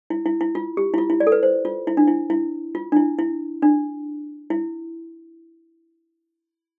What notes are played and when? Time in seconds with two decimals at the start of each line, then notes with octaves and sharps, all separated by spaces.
0.10 E4
0.26 E4
0.41 E4
0.55 F4
0.77 G4
0.94 E4
0.98 F4
1.10 E4
1.20 D5
1.27 A4
1.32 B4
1.43 C5
1.65 F4
1.87 E4
1.97 D4
2.07 E4
2.30 E4
2.75 F4
2.92 D4
2.96 E4
3.19 E4
3.62 D4
4.50 E4